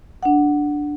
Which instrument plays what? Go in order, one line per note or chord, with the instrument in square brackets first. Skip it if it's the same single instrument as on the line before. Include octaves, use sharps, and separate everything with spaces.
[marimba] D4 F#5